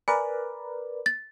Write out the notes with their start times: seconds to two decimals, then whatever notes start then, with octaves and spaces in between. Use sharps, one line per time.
0.08 A#4 B4 D5 G#5
1.06 A6